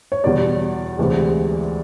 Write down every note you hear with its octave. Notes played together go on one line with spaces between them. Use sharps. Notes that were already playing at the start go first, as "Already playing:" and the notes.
C#5
E2 B2 G3 D5
D2 C3 E3 G#3